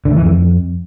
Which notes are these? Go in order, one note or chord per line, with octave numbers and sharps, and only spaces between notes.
D3
A3
E3
F2